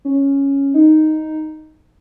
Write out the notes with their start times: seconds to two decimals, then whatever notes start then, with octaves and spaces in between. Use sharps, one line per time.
0.05 C#4
0.74 D#4